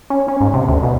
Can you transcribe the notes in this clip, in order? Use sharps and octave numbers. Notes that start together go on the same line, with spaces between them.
C#4
C#4
G#2
C3
D2
B2